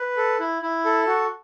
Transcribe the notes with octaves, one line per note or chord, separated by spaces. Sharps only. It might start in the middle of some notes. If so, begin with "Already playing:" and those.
Already playing: B4
A4
E4
E4
A4
F#4